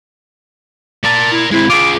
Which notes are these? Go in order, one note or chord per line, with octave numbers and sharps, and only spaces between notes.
A#4 D5 A5
E4
G#3 C4 E4
F4 G#4 D6